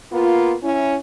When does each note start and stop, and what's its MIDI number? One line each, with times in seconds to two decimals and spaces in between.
0.12 0.53 58
0.12 0.53 59
0.12 0.53 65
0.63 0.95 61
0.63 0.95 64